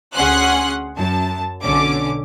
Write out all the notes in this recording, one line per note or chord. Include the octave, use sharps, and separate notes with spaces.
D2 C#4 G#4 F#5 C6 F#6
F#2 A5
B1 D3 C#4 D6